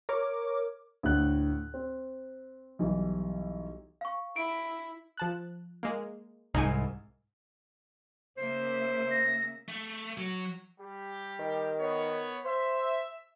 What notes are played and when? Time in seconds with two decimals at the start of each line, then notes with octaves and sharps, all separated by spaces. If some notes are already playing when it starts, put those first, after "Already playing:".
0.09 A#4 C#5 D6
1.03 D2 A2 F#6
1.74 C4
2.79 B1 E3 G3 E4
4.01 F5 C#6
4.36 E4 D7
5.17 F3 A5 F#6
5.83 G#3 A#3
6.54 C2 G#2 D#4 G#5
8.37 C#3 A#3 C5 E5
9.11 A#6
9.68 A3
10.18 F#3
10.80 G3 G4
11.39 D#3
11.79 B3 C#5
12.45 C5 E5